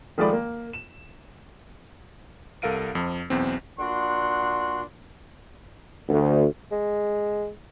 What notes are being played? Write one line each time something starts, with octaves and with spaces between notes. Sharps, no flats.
D#3 F3 G#3 A3 D5 B5
A#3
E7
C2 A4 A#4 F5 D7 D#7
F2 F3
B1 E2 C4
A#2 D4 F#4 F#5 C6
D2
G#3